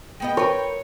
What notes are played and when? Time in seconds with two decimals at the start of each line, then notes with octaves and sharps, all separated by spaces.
0.20 G#3 B3 D#5 G5
0.37 A#4 B4 C#5